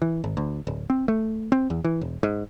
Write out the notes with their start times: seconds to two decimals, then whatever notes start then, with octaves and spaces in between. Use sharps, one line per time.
0.02 E3
0.24 G#1
0.37 D2
0.67 D1
0.90 C4
1.08 A3
1.52 C4
1.70 E2
1.85 E3
2.01 E1
2.23 G#2